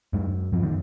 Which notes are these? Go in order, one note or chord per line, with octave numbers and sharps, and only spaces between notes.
F#2 G#3
F#2 F3
D#3